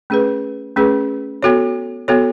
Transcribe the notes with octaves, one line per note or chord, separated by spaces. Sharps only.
A3 C#4 G#4 B4
A3 C#4 G#4 B4
B3 F#4 A4 C#5
B3 F#4 A4 C#5